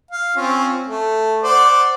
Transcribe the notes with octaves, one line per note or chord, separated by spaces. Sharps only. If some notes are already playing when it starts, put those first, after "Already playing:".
F5
C4 C#4 F4
A3
C5 D5 F#5